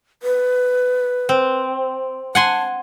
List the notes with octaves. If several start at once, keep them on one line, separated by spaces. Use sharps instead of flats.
B4
C4
F#5 G#5 A5 C6